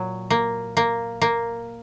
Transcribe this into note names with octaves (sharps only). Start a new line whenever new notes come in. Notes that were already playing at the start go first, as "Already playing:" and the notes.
Already playing: A#2 F#3
A#3
A#3
A#3